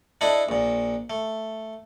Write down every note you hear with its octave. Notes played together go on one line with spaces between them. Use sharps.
D4 E4 A4 D#5
A#1 A#2
A3